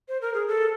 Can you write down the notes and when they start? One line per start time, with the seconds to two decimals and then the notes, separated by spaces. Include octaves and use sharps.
0.08 C5
0.21 A#4
0.34 G#4
0.47 A4